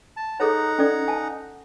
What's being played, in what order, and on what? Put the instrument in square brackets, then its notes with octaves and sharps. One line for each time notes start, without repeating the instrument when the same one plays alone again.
[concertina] A5
[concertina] D#4 F#5 A#5 [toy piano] G#4 A4 C#5
[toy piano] C#4 A4 D5
G#5 A5